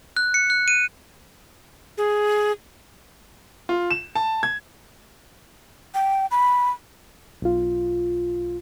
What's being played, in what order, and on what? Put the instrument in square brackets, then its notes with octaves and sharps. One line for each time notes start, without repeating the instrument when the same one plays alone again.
[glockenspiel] F#6
C#7
F#6
D#7
[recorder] G#4
[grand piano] F4
E7
A5
G#6
[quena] G5
B5
[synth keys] B1 F4